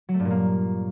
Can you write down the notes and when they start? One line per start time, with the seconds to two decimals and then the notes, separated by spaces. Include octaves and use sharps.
0.09 F#3
0.14 A3
0.20 G2
0.25 A#2
0.31 A#3